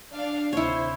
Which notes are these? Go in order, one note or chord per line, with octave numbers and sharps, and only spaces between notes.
D4 F5
D2 C3 E4 C5 C#5